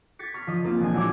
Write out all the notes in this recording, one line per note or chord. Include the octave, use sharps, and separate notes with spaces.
G#6 A6 B6 C#7
C#6 F6 B6 C7
F3 D#5 D#6
A#3 C4 F4
A#1 F3 G#3 G#5
F#3 E4 D6 G#6